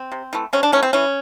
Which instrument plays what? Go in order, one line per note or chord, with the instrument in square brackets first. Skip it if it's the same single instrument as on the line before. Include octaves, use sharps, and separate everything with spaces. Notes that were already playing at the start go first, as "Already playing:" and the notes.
Already playing: [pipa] C4
C3
E3 A3
C3 C#4
D4
E3 A3 C#4
C4
E3 C#4